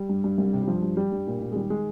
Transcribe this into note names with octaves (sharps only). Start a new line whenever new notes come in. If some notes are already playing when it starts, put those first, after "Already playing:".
Already playing: G3
G2
G2
C2
C3
G3
G2 F3
G2
G2 G3
G2
A#2
A#2
G#3
D#3 G3
D#3 G#3